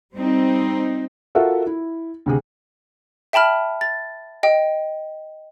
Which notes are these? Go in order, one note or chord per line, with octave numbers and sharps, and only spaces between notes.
G3 C4 D#4
F4 F#4 A4 A#4 E5 F#5
E4
D2 C3 G#4
E5 G5 A5 B5 F6
A6
D#5 G5